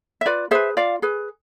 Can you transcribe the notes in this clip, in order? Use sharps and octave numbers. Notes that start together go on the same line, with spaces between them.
E5
F4 B4 D5
G#4 B4 C5 E5
F4 D5 F5
G#4 B4